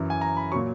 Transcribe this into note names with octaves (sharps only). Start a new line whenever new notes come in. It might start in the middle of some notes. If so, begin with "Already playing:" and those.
Already playing: F#2 E3
G#5
A#5
B5
A#2 F#3 C#6